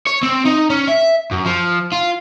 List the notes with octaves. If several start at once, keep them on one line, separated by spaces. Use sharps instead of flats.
C#5
C4
D#4
C#4
E5
F#2
F3
F4